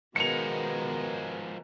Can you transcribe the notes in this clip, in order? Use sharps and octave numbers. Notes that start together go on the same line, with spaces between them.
B2 D#3 F3 G#3 B3 A#4 C#7 F7